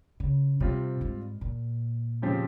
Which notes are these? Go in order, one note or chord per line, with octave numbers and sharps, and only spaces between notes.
C#3
C3 G3 C4 F4
G#2
A#2
C#3 F3 C4 G4